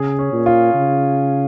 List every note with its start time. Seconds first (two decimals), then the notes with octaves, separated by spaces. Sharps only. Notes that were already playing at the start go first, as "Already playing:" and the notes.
Already playing: C#3 G#4
0.19 C#4
0.33 A#2
0.46 F4
0.74 C#3